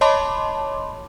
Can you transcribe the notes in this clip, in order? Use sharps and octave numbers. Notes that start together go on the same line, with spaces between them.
C#5 D#5 A5 B5 C6 D6